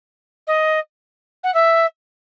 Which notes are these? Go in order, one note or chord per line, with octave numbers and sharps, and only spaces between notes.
D#5
F#5
E5